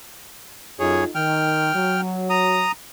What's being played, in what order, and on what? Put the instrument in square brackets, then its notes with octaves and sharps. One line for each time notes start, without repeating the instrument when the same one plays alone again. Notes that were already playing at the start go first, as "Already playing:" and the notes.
[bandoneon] F#2 G#4 C#5 [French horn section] D#4 F4 A4
[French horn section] D#3 [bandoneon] G5 F6
[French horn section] F#3
[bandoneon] A#5 D#6